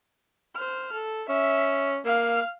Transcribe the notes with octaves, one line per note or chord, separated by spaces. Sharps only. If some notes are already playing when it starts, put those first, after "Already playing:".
C5 F6
A4
C#4 E5
A#3 F5 F6